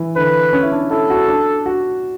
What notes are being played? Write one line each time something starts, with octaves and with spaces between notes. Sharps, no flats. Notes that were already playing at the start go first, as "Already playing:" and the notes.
Already playing: E3
D3 B4
C#4
E4
D4
E4 A4
F#4
D4
F#4